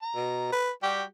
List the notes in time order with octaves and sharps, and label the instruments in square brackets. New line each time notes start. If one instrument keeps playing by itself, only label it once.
[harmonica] A#5
[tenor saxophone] B2
B4
[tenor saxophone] G3 [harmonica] F#4 G4